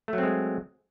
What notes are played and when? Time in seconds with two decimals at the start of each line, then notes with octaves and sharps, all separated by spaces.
0.08 A3
0.13 F#3
0.18 C4
0.23 G#3